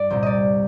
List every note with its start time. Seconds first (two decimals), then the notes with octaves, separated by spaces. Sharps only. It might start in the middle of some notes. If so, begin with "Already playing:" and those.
Already playing: G2 D5
0.10 C2 A#2 G3 C5
0.23 D5 D#5